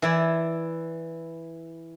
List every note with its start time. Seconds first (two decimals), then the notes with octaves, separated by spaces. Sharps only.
0.02 E3 E4 D5